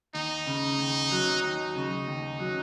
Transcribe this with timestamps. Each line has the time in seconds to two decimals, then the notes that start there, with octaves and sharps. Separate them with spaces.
0.15 D#2 D#4
0.47 C#3
0.79 D#2
1.11 F#3
1.43 D#2 D#4
1.76 C#3
2.07 D#2
2.40 F#3